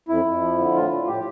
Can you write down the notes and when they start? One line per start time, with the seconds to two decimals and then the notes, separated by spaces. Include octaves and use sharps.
0.09 F2 E4
0.25 F2
0.41 F3
0.58 D3
0.74 A2 F4
0.91 A2
1.07 A2 G4